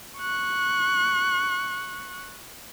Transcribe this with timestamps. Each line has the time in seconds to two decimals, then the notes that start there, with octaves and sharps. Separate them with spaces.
0.19 C#6 F#6